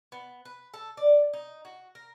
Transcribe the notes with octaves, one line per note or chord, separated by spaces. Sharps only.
B3
B4
A4
D5
D#4
F#4
A#4